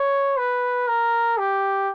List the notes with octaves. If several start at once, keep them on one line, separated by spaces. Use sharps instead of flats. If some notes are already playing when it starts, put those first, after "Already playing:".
Already playing: C#5
B4
A#4
G4